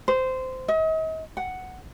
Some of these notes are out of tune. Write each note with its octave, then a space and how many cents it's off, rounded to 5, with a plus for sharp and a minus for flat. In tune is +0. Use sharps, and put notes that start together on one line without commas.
C5 -15
D#5 +40
F#5 +5